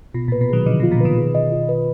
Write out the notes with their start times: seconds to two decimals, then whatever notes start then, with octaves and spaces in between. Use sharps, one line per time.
0.14 B2 F4
0.28 A#2 B4
0.41 B2
0.50 D#3 F#3 G#4
0.66 D3 F3 D#5
0.80 B2 F4
0.91 A#2 D3
1.00 B2 D#3 B4
1.17 G#4
1.35 D#5
1.52 F4
1.69 B4